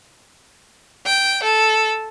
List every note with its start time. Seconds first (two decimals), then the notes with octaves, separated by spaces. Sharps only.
1.06 G5
1.43 A4